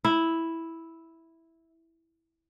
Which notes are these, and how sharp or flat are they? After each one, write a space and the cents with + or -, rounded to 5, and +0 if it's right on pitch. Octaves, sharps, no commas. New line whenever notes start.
E4 -5